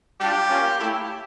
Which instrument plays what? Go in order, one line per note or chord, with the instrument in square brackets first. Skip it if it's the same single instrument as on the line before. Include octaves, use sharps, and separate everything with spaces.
[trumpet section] G3 D4 F4 G4
A#3 C#4 F4
A3 E4 G4